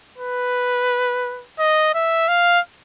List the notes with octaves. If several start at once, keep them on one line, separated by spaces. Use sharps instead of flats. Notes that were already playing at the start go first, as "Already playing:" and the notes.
B4
D#5
E5
F5